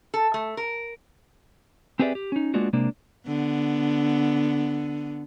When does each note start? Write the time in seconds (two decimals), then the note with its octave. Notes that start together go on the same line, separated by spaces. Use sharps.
0.14 A4
0.34 A3
0.57 A#4
1.99 C4 G4 G#4 B4 D5 E5
2.15 G4
2.32 C#4 D#4
2.54 G#3 A#3 B3 D4 F4 F#4
2.73 C3 G#3 A#3 D4
3.27 D3 B3